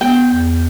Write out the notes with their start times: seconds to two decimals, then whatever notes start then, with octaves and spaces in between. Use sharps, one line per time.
0.01 B3 G5
0.32 E2